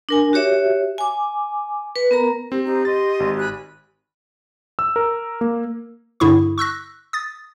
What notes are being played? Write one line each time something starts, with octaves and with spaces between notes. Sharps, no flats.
D4 A#4 G#5
F#4 G4 C#5 E5
G#5 D6
B4
B3 A#4 A#5
C4 G4
D#4 G4 C5 A#5
D#5 C6 A6
G#1
G#5 B5 F#6
E6
A#4
A#3
G2 D3 E4 G#4 C#6
C#6 E6 F#6 A#6
D#6 A6